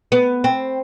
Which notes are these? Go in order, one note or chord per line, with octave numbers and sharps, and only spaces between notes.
B3
C4